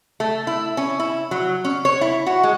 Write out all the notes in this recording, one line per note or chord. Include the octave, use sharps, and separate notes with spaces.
A3
E4
C#4
E4
F#3
C#4
C#5
E4
F#4
G#3